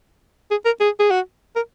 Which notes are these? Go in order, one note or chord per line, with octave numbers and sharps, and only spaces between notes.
G#4
A#4
G#4
G#4
F#4
A#4